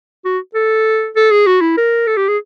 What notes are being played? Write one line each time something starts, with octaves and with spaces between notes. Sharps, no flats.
F#4
A4
A4
G#4
F#4
E4
A#4
A4
G4
G#4